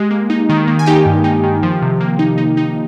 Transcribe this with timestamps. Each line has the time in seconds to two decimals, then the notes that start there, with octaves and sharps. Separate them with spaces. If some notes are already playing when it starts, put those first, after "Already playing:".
Already playing: G#3 G4
0.11 A#3
0.30 D#4
0.49 D#3
0.67 A#3
0.79 G#5
0.86 D#4 G4 G5
1.06 G2
1.24 D#4
1.44 D#3
1.63 F3
1.82 C3
2.00 A#3
2.19 D#4
2.38 D#4
2.57 D#4